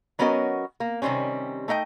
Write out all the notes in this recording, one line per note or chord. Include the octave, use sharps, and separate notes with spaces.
F#3 B3 C#4 F#4 A#4 D#5
A#3
C3 D#3 G3 C4 C#4
A3 D#4 D#5 G5